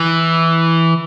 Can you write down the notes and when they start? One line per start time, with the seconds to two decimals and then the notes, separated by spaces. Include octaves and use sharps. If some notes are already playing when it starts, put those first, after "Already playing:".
Already playing: E3